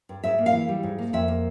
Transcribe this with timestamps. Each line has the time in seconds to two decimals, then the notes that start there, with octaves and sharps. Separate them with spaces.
0.09 G2
0.24 G#2 E5
0.38 A#3
0.46 F5
0.53 E3
0.68 G3
0.83 G#2
0.98 A#3
1.13 F2 E5
1.28 A#3